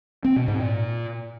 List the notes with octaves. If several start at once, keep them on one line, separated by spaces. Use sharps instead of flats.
C4
B2
G#2
A#2